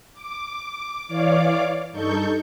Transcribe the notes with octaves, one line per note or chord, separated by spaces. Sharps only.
D6
E3 C#5 D5 F5 D6
G2 D#4 A4 C#6 G6